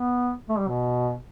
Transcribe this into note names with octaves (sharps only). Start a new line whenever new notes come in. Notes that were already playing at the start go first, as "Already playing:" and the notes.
Already playing: B3
A3
G3
B2